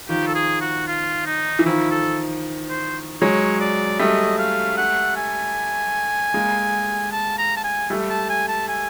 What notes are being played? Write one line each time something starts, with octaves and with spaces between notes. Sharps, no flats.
D#3 F3 G4
A4
G#4
F#4
F4
D#4
E3
D#3 F3 E4
A4
C5
F#3 G#3 C#5
D5
G3 A3 D#5
F5
F#5
G#5
G#3 A#3
A5
A#5
A5
G#5
G3 A3
A5
G#5
A5
G#5